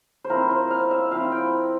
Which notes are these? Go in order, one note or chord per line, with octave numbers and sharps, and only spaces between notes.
C5
F3 C4 E4 A#4
C5
F5
E5
F3 C4 E4 F5
G5